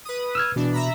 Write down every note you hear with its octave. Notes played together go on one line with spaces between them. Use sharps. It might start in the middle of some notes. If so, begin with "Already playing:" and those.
B4 D#6
E6 F6 G#6
B2 E3 D4
E5 A#5 B5